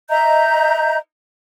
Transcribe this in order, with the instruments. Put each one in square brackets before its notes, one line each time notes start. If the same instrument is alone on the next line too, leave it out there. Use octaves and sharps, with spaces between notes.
[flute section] D#5 E5 A#5 G6